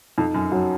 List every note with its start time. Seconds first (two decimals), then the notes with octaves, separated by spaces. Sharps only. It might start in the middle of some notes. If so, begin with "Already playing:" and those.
0.18 F2 D#4
0.34 F#2
0.52 F#2 F#3